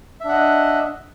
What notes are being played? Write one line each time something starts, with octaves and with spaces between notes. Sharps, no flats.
D4 D#5 E5 F#5